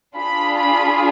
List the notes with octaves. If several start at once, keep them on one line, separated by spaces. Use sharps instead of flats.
D4 F4 G#4 B5
B5